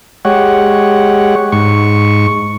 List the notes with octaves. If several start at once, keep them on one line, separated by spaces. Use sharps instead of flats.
G#3 G4 C#5 F#5
G#2 C#6